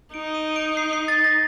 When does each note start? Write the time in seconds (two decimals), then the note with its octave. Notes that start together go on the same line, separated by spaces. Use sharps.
0.14 D#4 D7
0.34 D#7
0.56 D7
0.77 C7
0.93 C7
1.08 A6
1.24 A#6